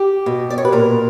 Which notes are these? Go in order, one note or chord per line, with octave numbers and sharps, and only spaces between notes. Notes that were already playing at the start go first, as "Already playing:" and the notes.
Already playing: G4
B2
D5
C#5
B4
A#2 A#4